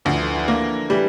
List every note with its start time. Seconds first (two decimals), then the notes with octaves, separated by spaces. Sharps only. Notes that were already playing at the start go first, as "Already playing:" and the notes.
0.05 D2 F3
0.14 E3
0.23 D3
0.33 E3
0.48 D3 A#3
0.90 E3 G3